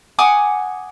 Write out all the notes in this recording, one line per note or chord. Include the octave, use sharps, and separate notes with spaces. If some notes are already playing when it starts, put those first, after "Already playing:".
F#5 G#5 D6 D#6